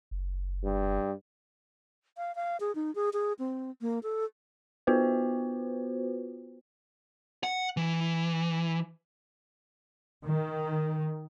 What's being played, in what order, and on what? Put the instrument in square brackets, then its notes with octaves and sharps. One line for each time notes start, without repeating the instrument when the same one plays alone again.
[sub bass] F#1
[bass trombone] G2
[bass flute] F5
F5
G#4
D#4
G#4
G#4
C4
A#3
A4
[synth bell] B3 F4 F#4 B4 C5
[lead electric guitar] F#5
E3
[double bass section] D#3